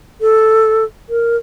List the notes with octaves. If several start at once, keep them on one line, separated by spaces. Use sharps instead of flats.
A4
A#4